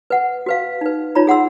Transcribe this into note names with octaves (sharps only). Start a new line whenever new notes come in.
B4 F#5
F#4 B4 F5
D#4 B4
D#4 F4 C#5 A#5 B5
G#4 F#5 C6 E6